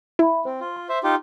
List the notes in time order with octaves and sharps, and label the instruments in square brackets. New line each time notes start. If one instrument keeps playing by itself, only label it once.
[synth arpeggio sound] E4 [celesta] E5 B5
[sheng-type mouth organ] C4 [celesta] C5
[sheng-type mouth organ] F4
[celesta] C6
[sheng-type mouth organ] C5 E5
D#4 F4 G4